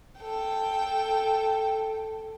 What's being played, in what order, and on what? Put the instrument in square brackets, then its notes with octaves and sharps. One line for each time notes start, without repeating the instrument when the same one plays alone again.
[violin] A4 G5